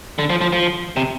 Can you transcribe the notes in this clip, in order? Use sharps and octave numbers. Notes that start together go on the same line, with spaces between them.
D3
F3
F3
F3
C3